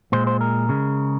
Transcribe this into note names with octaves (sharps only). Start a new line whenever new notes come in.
A#2 G#3 C5
C5
A#4
C#3 G#3